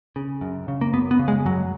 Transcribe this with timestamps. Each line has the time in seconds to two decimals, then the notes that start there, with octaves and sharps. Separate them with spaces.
0.16 C#3
0.41 F#2
0.68 C#3
0.81 A#3
0.93 F#2 B3
1.11 B3
1.19 C#3
1.28 G#3
1.45 F#2 F#3